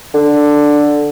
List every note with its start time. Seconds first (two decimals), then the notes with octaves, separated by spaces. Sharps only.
0.14 D3